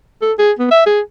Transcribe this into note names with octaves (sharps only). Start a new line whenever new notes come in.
A4
G#4
B3
E5
G#4